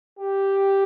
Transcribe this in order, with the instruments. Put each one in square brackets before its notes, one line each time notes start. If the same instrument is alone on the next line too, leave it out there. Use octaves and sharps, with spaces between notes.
[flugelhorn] G4